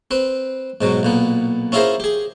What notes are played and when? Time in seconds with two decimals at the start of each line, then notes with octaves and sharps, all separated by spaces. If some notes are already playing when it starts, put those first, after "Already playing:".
0.11 C4 B4
0.81 G#2 B2 F#3
1.03 B1 A#2 B3
1.72 C#4 E4 F4 G#4 A#4 C5
2.00 G4 G#4